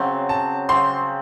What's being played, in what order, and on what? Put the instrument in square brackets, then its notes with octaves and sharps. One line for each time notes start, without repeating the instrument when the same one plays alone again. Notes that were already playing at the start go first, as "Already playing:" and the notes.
Already playing: [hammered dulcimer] C#3 F#3 C4
[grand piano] A5
[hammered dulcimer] C#3 F#3 C4 [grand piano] C6